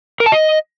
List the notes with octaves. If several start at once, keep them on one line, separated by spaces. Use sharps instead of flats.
A#4
A5
D#5